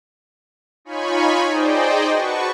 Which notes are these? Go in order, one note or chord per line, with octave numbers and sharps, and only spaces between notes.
D#4 F4 C#5 G#5 B5 C#6
D#4 G#4 C5 D5 D#5 G5
F#4 B4 A5 C#6